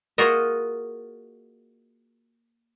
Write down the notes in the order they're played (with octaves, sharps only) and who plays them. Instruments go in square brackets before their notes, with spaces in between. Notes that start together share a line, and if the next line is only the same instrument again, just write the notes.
[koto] A#3 F4 F#4 G#4 A#4 D#5